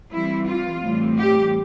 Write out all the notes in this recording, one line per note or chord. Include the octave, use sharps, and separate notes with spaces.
E3 G3 C4 E4
F4
A2 E3 G3 C4
G4